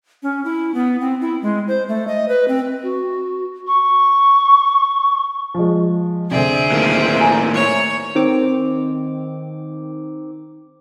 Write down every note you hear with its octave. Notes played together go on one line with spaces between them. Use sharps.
C#4
E4
B3
C4
E4
G#3
C5
A3
D#5
B4
C4
F#4
C#6
F3 G#3
D2 C3 C4 G#4 D5 E5
A2 D#3 A#3
G#5 A#5
C#5
D#3 C4 D6